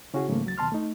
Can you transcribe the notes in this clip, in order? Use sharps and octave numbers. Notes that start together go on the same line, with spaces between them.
C#3 C#4 E4 F#4 G#4
G#2 C#3 E3 F#3 A3 A#3
D2 F#3 A6
D#2 B2 A5 C6 F6
A3 D#4